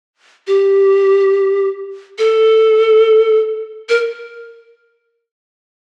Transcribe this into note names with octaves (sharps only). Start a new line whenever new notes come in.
G4
A4
A#4